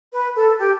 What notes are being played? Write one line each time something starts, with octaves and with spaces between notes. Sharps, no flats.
B4
A4
G4